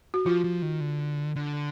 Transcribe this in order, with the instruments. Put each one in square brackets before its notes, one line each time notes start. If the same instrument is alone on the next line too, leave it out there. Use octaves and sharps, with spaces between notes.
[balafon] F#4
[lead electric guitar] F3 [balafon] F4
[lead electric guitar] F3
D#3
D3
D3